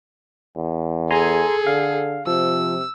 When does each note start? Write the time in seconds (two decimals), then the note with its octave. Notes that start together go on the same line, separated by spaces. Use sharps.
0.56 E2
1.11 G#4 A4 G#5 A#5 C6
1.67 D3 F5
2.27 C3 F3 E6